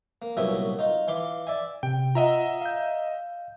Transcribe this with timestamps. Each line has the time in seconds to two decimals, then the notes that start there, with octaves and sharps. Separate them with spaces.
0.22 A#3
0.37 C2 A#2 F#3 B3 E5 G#5
0.79 D#4 F4
1.08 E3 F5 C6 D6
1.47 D5 E5 G#5
1.83 C3 G5
2.15 F4 D#5 E5 F#5 A#5
2.61 F5 G6